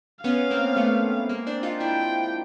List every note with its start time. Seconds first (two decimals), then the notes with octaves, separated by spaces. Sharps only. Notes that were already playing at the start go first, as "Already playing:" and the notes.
0.24 B3 C#4 F5
0.50 A#3 C4
0.76 A3 B3
1.29 G#3 A#3
1.47 C4 D4
1.63 D#4 F4
1.80 D4 E4 G5